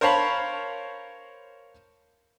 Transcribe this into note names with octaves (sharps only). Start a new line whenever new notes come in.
A#4 C5 C#5 F5 A5 B5